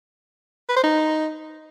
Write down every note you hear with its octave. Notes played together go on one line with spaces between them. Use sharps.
B4
C5
D#4